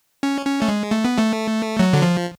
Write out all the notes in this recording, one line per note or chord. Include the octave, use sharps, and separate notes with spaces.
C#4
C#4
A3
G#3
A3
B3
A3
F#3
D3
F3